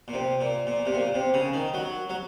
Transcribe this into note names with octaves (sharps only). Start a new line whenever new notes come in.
A#2
C3
A#2
A#2
C3
A#2
C3
C#3
D#3
F#3
F#3